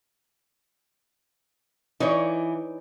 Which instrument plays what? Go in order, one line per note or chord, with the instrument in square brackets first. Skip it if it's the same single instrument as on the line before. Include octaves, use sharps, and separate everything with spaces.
[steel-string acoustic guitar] E3 [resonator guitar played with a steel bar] D#4 C#5 D5